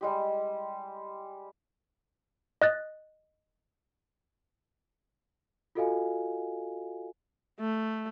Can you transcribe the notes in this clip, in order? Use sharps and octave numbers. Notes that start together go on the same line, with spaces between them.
G3 G#3 G4
D#5 F#6 A6
F4 F#4 A4 D#5 F5 G#5
A3